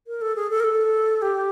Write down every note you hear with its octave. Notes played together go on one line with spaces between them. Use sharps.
A#4
A4
G#4
A4
A#4
A4
G4